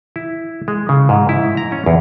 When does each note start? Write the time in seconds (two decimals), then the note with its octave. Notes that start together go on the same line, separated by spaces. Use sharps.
0.16 E4
0.68 G#3
0.89 C#3
1.09 G#2
1.29 E4
1.57 A#5
1.72 C#4
1.86 E2